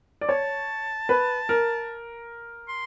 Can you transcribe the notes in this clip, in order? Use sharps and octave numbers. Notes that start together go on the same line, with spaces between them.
D5
C#5 A5
B4
A#4
C6